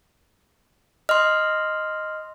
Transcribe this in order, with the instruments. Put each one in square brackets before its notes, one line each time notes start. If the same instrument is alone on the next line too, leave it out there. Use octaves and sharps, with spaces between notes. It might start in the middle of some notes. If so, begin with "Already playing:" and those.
[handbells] D#5 [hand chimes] C6 F6